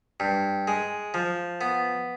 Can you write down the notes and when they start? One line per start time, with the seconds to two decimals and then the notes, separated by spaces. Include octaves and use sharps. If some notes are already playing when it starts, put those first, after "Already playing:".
0.20 G2
0.68 G#3
1.14 F3
1.61 B3